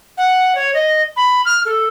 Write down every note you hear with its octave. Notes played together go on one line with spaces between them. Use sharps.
F#5
C#5
D#5
B5
F6
A4